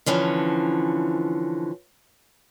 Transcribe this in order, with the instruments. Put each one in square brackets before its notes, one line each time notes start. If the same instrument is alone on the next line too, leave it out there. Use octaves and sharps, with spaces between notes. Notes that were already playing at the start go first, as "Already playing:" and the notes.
[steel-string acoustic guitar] D3 E3 F3 C#4